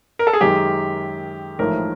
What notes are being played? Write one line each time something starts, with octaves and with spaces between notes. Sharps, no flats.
A#4
A4
G#4
F#2 D#3 G#3 G4
A1 G#2 F3 A3 A#4